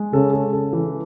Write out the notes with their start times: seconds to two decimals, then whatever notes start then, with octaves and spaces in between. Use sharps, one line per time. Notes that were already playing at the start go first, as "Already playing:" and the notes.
Already playing: G#3
0.13 C#3 A4
0.33 A4
0.53 A4
0.73 E3